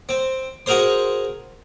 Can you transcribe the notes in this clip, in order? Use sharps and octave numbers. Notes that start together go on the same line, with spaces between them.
C4
F#4 G#4 A#4 C5 C6